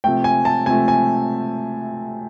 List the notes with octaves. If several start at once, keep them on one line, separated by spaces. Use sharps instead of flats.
C3 F3 A3 G5
G#5
A5
C3 F3 A3 G#5
G#5